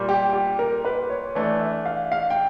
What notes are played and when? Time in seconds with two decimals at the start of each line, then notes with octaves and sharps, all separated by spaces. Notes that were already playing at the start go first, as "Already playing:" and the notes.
Already playing: A#2 G3 A#3
0.09 G4
0.33 G4
0.59 A#4
0.85 B4
1.10 C#5
1.35 E3 A3 D4 D5
1.60 E5
1.86 F5
2.12 F5
2.30 G5